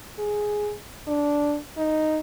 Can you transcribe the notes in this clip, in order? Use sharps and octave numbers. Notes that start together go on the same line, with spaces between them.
G#4
D4
D#4